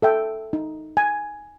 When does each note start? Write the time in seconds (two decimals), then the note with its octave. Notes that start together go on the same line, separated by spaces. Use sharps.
0.02 A4 E5 G5
0.53 D#4
0.97 G#5